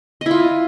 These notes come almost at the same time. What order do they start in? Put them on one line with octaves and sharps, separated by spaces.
D#5 E4 F4